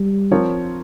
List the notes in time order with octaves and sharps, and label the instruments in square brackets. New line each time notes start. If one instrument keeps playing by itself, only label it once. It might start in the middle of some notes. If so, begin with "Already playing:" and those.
Already playing: [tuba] G3
[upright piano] F3 C4 F4 A#4 C#5